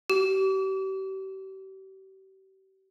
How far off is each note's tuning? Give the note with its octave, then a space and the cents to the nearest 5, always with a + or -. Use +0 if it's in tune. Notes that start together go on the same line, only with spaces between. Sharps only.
G4 -40